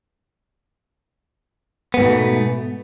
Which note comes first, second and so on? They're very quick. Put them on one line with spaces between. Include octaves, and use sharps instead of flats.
B3 G#2 B2 A3